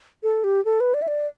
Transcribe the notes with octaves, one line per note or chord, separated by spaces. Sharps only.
A4
G4
A4
B4
D5
E5
D5